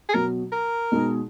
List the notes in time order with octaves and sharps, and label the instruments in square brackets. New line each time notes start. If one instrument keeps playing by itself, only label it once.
[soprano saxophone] G#4
[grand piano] B2 F#3 B3 F#4 [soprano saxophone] A#4
[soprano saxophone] A#4
[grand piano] B2 G#3 D#4 G#4